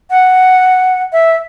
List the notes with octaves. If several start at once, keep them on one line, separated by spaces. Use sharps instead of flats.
F#5
E5